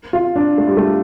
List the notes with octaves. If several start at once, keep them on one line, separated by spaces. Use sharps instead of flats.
F4
D4
A3
G3
A3